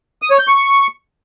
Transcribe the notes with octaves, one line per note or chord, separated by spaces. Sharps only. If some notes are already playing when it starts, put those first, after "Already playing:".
D#6
C#5
G6
C#6